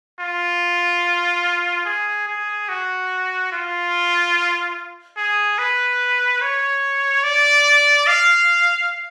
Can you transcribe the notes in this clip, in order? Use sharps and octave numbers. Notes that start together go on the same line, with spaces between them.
F4
G#4
G#4
F#4
F4
G#4
B4
C#5
D5
F5